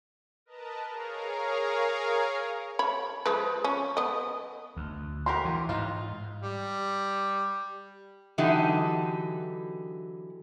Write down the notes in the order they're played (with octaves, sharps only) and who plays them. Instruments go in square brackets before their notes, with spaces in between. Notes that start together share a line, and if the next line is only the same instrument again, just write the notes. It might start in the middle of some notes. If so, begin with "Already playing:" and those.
[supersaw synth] A#4 B4 D#5 A5 A#5
G#4 A#4 C#5 F5 A#5
[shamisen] C#5 B5
F3 G#3 B4
C#4
B3 D#5
[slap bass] D2
[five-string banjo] F#4 G4 A#4 [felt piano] C6
[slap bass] E3
[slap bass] G#2 [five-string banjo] D#4 F4
[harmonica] G3
[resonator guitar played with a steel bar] D3 E3 F#3 D#4 G4